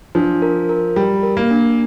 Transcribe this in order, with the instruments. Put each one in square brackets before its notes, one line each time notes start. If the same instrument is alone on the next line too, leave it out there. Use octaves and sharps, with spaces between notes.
[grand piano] F3 [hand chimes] D4
[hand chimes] A#4
A#4
[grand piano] G3 [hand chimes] G5
[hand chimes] A#4
[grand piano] A#3
[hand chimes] D4